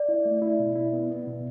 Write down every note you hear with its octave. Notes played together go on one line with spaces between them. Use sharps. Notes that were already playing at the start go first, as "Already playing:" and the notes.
Already playing: D5
E4
A3
E4
B2
E4
B3
B3
B2